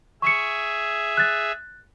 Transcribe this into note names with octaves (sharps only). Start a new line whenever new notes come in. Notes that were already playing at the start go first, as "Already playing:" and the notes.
G#4 E5 C#6 C#7
F#6 A6